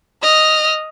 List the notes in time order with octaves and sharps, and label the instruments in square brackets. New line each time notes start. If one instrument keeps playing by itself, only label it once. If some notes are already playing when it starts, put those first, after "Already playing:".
[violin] D#5 F6